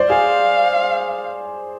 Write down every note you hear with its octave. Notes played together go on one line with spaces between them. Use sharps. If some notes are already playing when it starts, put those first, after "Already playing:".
Already playing: C5 D5
G#4 F5